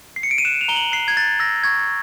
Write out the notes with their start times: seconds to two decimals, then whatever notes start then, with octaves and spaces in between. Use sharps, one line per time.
0.16 C7
0.23 C#7
0.31 D7
0.38 D#7
0.45 F#6 E7
0.61 F7
0.68 A#5 G7
0.76 F#7
0.92 F#6 C7
1.08 G#6
1.17 F#6 A6
1.40 E6 A#6
1.64 C#6 G#6